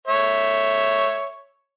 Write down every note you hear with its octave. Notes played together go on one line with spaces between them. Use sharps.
C#5 E5